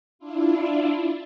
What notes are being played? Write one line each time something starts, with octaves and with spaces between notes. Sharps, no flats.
D4 E4 F4